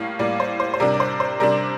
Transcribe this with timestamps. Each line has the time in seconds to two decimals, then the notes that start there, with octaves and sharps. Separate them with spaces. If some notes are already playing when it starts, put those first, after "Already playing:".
Already playing: A2 G3 A#3 F5
0.19 A2 G3 A#3 D5
0.40 C5
0.60 C5
0.74 C5
0.80 C3 G3 D4 A#4
0.94 D5
1.00 C5
1.20 C5
1.40 C3 G3 D4 A#4